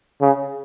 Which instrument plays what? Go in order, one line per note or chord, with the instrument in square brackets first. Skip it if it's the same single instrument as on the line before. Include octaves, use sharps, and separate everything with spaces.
[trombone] C#3